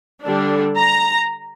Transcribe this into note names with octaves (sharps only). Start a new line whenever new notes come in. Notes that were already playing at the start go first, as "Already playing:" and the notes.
D3 G3 D4
A#5